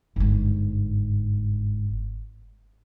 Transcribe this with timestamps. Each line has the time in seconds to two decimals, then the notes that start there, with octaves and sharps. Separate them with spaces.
0.16 G1 G#2